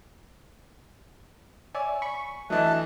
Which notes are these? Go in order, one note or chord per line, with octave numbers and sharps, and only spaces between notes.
C#5 D5 E5 G#5
B5 C#6
E3 F#3 A3 D4 D#5 E5 A5 F#6